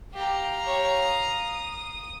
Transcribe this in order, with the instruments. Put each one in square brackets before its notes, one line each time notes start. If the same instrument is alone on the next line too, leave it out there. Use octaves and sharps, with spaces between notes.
[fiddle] G4 [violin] F5 A#5
[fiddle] G4 C#5
D#6